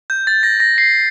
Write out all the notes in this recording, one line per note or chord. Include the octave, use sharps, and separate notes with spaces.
G6
A6
A#6
A#6
C7